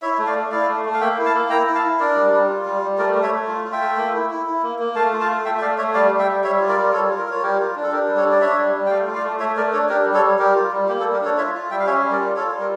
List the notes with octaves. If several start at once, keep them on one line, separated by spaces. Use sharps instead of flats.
E4 C#5 E5
A3
D5 F5
A3
E4 D5 F5
A3
A3
F5
A#3 E5 G5
E4
F5 A5
A#3
E4 G5 A#5
E4
F5 A5
E4
D4 A#4 D5
G3
G3
F4
G3
G3
A3 A#4 D5
A3
C#5 E5
A3
F4
F4
E5 G5
A3
A#3
E4
E4
E4
A#3
A#3
A3 F5 A5
F4
F5 A5
A3
A3 E5 G5
E5
A3 D5 F5
A3 C#5 E5
G3 D5 F5
G3
E5 G5
G3
G3 C#5 E5
F4
A#4 D5
G3
A#4
G3 A4 C#5
F4
A#4
F4 C#5
G3 G4 A#4
F4
D4
A4
D4 G4 A#4
G3
A4 C#5
D4
D5
D4 C#5 E5
G3
G3
G5
A3 D5 F5
F4
D5 F5
A3
A3 C#5 E5
A3 A#4 D5
D4 A4 C#5
D4 G4 A#4
G3
A4 C#5
G3
G3 G4 A#4
F4
G3
A#3 G4
A4
G3
G4 A#4
D4 A4 C#5
F4 C#5 E5
F4
G3 E5 G5
F5
C#4 C#5 E5
G3
A#4 D5
F4
F4 A4 C#5
G3
A#4